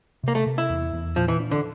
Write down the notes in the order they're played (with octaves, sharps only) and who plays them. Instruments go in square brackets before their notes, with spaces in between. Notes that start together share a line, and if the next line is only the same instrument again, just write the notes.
[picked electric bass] C3 [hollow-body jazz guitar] A#3
[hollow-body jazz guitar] A3
[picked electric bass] C3
[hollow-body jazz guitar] E4
[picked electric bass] E2
E2
[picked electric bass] A#2 [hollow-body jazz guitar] F3
[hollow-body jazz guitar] E3
[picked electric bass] D4
[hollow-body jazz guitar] D3